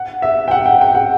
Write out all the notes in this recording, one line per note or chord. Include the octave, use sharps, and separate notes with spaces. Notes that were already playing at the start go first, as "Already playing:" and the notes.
Already playing: F#5
E5
G5
F#5
G5
G5
F#5